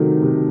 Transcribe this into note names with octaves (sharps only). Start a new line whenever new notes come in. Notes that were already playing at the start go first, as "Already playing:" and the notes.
Already playing: C3 D#3 F#3 A3
C3